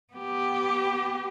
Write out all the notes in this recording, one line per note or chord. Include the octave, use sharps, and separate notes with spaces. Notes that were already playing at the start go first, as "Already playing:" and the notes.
B3 G4